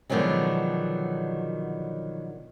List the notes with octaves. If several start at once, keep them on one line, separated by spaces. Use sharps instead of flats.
B2 D3 D#3 F3 F#3 G#3